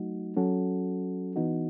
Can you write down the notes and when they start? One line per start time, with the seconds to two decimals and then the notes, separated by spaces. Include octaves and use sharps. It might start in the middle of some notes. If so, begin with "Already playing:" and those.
Already playing: F#3 A3 D#4 F#4
0.37 F#3 C#4 F#4 A4
1.36 E3 B3 D#4 F#4